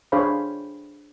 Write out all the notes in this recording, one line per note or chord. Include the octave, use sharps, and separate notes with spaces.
D4 G#4 C5 C#5 F5 B5